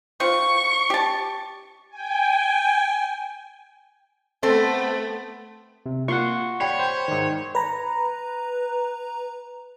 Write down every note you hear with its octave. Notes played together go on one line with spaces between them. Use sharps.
C4 F4 C#6
G4 A5
G5 G#5
A3 B3 C4 A4 C5
C3
A#3 F4 F#5 C6 C#6
G4 C#5 D5 G5 B5
C5
G#2 D#3
B4 A#5